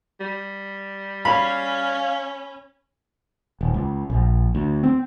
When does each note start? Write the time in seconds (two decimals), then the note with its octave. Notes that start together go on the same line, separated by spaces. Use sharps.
0.21 G3
1.25 C#4 F5 B5
3.61 D#1
3.74 C#2
4.10 A#1
4.55 D2
4.83 C4